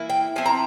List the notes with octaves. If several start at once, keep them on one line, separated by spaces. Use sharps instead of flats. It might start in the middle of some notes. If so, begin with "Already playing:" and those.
Already playing: E3 A#3 E4
G5
F3 C4 E4 G#5
A#5